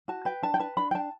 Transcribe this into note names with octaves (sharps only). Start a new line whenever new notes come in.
F#4 A5
B4 G5
D4 A5
G5
B4 A5
D4 B5
G5
D4 A5